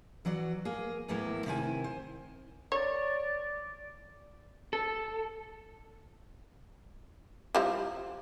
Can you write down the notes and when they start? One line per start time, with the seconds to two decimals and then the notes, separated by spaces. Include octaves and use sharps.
0.25 E3 F#3 F#4 D5
0.65 A#3 G#4
1.08 E2 A2 E3 F#3 A#3 E4
1.46 C3 D#3 E4 C5 G#5
1.84 C5
2.72 C#5 D5
4.73 A4
7.55 F3 G3 E4